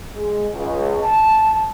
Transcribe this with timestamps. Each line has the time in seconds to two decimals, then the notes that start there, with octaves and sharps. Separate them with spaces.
0.16 G#3
0.53 C#2
1.02 A5